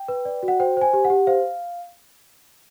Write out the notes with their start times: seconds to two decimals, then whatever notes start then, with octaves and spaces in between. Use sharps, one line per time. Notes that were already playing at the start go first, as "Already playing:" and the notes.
Already playing: G5
0.08 B4
0.25 D5
0.43 F#4
0.48 F#5
0.60 C5 G5
0.77 C5 G#5
0.93 G4
1.05 F#5
1.10 G4
1.27 C5 F5